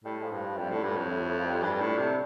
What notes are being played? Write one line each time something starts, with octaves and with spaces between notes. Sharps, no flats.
A2 G3
F3
G2
F3
F2 G3
A2 D3
G2
F2 A2
A2
A2
F3
G3
G2 D4
A2
C3